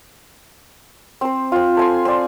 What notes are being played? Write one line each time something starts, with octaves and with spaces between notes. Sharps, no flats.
C4 C5
C4 F4
A4 G#5 C6
C4 D5